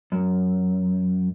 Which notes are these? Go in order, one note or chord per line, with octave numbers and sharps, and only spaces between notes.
F#2